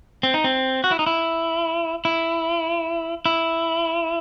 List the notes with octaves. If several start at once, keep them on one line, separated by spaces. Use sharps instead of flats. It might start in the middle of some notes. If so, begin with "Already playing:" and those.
C4
D#4
C4
F#4
E4
D#4
E4
E4
E4